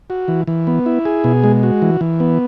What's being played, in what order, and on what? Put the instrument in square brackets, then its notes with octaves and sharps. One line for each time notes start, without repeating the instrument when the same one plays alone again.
[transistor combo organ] F#4
E3
E3
B3
E4
G#4
B2
G#3
F#4
E3
E3
B3